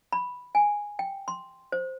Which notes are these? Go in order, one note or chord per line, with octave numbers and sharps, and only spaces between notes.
B5
G#5
G5
C6
C5